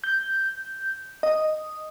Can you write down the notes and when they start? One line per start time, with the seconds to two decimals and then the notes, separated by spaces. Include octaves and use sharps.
0.04 G6
1.23 D#5